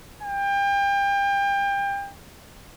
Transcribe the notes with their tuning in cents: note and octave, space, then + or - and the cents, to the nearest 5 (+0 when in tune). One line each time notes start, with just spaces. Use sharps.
G5 +30